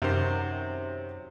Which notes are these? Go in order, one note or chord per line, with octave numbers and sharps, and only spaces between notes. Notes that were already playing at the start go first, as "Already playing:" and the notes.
F#2 C3 D#3 C5